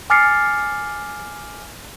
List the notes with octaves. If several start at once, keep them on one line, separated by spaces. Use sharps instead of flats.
G#5 D6 F6 A6 C7 C#7